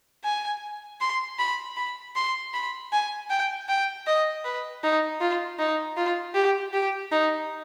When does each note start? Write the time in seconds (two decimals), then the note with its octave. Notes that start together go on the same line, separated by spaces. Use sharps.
0.24 G#5
1.01 C6
1.39 B5
1.77 B5
2.16 C6
2.54 B5
2.92 G#5
3.30 G5
3.69 G5
4.07 D#5
4.45 B4
4.83 D#4
5.21 F4
5.59 D#4
5.97 F4
6.35 G4
6.73 G4
7.11 D#4